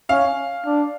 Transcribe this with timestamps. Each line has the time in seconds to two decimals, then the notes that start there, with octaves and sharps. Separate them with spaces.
0.09 C#4 F5
0.65 D4